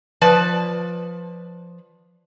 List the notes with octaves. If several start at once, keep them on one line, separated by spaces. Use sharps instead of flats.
F3 B4 D5 A5